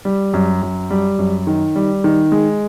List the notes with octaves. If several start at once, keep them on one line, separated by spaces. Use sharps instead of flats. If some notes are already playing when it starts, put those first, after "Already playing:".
G3
F#2
F#2
G3
F#2
D#3
G3
D#3
G#3